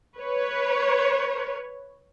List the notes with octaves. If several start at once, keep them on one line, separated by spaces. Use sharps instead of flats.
B4 C#5